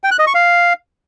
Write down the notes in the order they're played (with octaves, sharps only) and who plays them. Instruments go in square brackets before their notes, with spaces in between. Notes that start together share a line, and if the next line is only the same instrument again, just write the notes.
[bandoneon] G5
F#6
D#5
C#6
F5